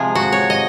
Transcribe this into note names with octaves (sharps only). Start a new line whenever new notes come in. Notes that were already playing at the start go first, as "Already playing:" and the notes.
Already playing: C3 F3 G#3 G#4
F#4
C#5
D#5